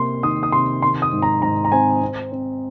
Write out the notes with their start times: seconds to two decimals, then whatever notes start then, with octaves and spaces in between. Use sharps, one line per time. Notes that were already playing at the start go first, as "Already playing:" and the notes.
Already playing: C3 A#3 C6
0.23 D#3 D#6
0.43 D#6
0.52 C3 C6
0.82 D#3 C6
1.02 D#6
1.12 G#2
1.22 A#5
1.42 G#2 A#5
1.65 A#5
1.72 C4 G#5
2.02 C4
2.32 C4